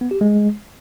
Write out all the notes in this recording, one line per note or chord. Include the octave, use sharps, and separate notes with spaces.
B3
G4
G#3